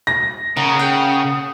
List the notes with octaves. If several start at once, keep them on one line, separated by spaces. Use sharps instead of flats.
A#6
C#3 A#3 D#4 F#5 D#6
G5